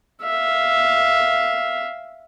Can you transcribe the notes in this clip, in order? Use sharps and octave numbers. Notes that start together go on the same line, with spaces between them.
E5 F5